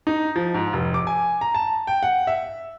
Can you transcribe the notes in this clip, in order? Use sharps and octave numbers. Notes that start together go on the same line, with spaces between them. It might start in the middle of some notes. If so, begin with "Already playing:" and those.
D#4
F3
G#2
F1
D6
G#5
A#5
A5
G5
F#5
E5